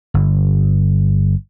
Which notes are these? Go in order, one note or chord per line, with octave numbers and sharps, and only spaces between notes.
G1